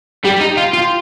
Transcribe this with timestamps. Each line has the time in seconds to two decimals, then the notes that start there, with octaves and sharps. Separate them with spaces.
0.24 G3 G4 G5
0.41 D#4
0.57 F4
0.73 F4